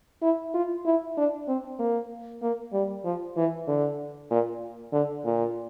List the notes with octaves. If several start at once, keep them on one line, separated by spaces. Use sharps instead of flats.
E4
F4
E4
D4
C4
A#3
A#3
G3
F3
E3
D3
A#2
D3
A#2